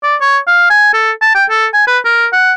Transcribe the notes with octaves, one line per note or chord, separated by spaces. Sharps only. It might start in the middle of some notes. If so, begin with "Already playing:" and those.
D5
C#5
F5
G#5
A4
A5
G5
A4
G#5
B4
A#4
F#5